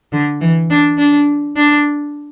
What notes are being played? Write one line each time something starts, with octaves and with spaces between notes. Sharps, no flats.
D3
E3
D4
D4
D4